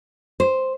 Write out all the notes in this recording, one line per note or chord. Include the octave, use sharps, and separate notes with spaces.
C5